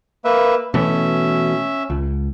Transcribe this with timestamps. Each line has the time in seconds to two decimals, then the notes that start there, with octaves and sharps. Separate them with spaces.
0.25 A#3 B4 E5
0.74 B2 E3 A3 C#4 E5
1.90 C#2